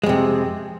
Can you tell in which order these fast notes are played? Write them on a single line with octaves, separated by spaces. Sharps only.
G#3 F2 C3